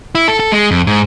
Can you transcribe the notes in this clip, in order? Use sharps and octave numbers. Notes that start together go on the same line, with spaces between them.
E4
A4
A4
G#3
F2
G#2